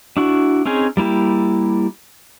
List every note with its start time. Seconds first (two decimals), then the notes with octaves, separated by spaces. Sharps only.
0.17 D4 E4 F#4
0.66 C4 C#4 D#4 G#4 G#5
0.97 G3 A#3 E4 G4